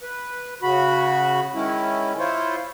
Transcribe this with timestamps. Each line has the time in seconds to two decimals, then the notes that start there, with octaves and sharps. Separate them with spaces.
0.02 B4
0.62 C#3 F#4 B5
1.55 D#3 G#3 C#4 E4
2.19 E4 F4 C5 C#5